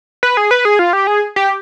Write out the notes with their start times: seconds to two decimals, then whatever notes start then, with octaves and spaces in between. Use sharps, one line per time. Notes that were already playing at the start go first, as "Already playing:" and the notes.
0.23 B4
0.37 G#4
0.51 B4
0.65 G#4
0.79 F4
0.93 G4
1.07 G#4
1.36 G4